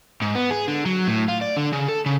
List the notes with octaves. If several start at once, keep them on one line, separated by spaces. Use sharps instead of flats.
G#2
B3
G#4
D3
F#3
A2
F4
D5
D3
C#3
A4
C#3